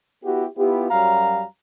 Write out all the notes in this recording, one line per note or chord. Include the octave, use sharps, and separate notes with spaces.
B3 E4 F#4 G4
B3 E4 F4 G4
F#2 F#3 G3 F5 A#5